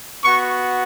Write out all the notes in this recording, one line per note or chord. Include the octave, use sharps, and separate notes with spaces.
B3 F#4 C#6